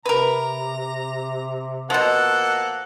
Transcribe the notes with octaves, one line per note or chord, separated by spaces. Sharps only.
C3 A#4 B4 A#5
B2 F3 A#3 A4 F#5